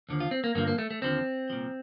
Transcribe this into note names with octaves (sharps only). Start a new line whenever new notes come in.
D#2 D3 F3
F4
C4
A#3
G2 D3 F3 A#3
A#3
A3
A3
D#2 D3 F3 C4
C2 A#2 F3